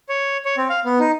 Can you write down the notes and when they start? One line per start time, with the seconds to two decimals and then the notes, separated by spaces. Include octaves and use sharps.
0.09 C#5
0.45 C#5
0.57 C4
0.69 F5
0.85 B3
0.99 D#4